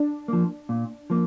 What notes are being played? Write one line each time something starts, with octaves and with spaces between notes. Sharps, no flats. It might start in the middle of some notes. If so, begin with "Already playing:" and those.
Already playing: D4
F3 A#3
A#2
F3 A#3